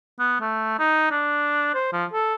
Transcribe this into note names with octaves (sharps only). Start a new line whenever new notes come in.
B3
A3
D#4
D4
C5
F3
A4